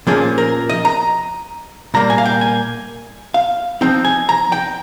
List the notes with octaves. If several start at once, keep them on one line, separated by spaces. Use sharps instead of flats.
A#2 F3 A#3 C#4 G#4
A#4
D#5
A#5
A#2 G3 A#3 A#5
G#5
F5
G5
G#5
F5
F3 C4 D#4 G5
G#5
A#5
G5